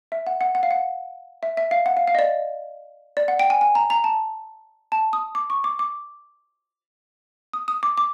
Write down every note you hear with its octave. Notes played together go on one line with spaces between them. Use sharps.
E5
F#5
F#5
F#5
F5
F#5
E5
E5
F5
F#5
F5
F5
D#5
D5
D5
F#5
G5
G#5
G#5
A#5
A#5
A5
A5
D#6
D6
C#6
D6
D6
D#6
D#6
D6
D6